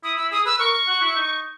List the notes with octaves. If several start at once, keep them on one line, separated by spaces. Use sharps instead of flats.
E4 D#6
E4 E6
G#4 D#6
B4 E6
A#4 C#6
F#4
E4
D#4